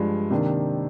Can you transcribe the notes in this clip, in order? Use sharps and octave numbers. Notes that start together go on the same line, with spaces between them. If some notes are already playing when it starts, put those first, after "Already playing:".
Already playing: G2 F3 G#3
C3 D#3 A#3 D4